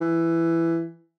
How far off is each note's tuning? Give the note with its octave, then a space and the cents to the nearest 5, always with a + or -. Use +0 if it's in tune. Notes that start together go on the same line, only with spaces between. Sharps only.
E3 +10